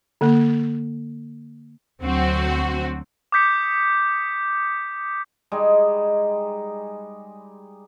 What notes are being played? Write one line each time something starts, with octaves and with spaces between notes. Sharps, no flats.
D3 A#3
D2 F#3 C4 F#4
D6 D#6 G6 B6 C#7
G3 G#3 D#4